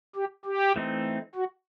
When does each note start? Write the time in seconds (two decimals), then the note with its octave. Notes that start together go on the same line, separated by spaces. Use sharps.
0.16 G4
0.45 G4
0.76 E3 A3 C4 D#4
1.35 F#4